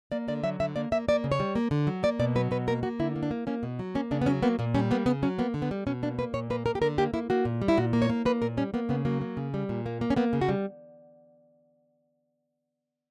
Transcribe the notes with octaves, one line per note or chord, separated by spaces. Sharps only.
A#3 D5
D3 D5
F#3 E5
D3 E5
A#3 D5
A#3 E5
A#3 D5
C#3
C#5
G3
A#3
D3
F#3
A#3 D5
B2 D5
F#3 B4
B2 B4
A#3 A#4
A#3 F#4
D3 E4
A#3
D4
A#3
A#3 C#4
B2
F#3
A#3 C#4
C#3 D4
B3
F#3 C#4
A#3 B3
A#2 A#3
G3 C#4
A#3 B3
C#3 B3
F#3 C#4
A#3 B3
D3
B3
G3
B2 C#4
A#3 D4
A#3 B4
A#2 C#5
A#3 B4
A#3 A#4
G4
D3 A#4
A#3 G4
A#3 E4
A#3 F#4
A#2
G3
E4
A#2 F#4
A#3
C#5
A#3
A#3 B4
A#2 A#4
G3 C#4
A#3 B3
C#3 B3
F#3 A#3
A#3
C#3
G3
A#2
A#3
A#3
C#4
A#3 B3
C#3
F#4
G3